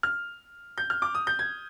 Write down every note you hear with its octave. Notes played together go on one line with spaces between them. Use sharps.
F6
G6
F6
D6
D#6
G6
G#6